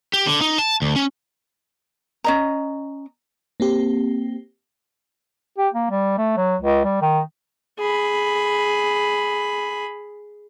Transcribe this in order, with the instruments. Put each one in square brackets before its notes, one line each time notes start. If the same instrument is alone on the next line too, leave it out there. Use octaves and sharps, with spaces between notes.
[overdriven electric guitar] G4
D3
D#4
A5
D2
C#4
[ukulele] C#4 D#5 A#5
[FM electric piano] A#3 C4 G4
[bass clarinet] G4
A#3
G3
A3
F#3
C#2
G3
D#3
[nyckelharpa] G#4 B5